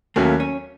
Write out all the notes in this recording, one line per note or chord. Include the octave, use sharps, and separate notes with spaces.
D#2 D#3 F#3 A3 A#3 C#4
C#4